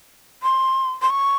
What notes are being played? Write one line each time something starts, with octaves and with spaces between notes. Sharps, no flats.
C6
C6
C#6